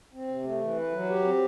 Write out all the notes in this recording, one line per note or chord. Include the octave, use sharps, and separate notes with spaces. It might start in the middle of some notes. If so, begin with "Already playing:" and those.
C4
C3
A3
E3
B4
F#3
G4
C4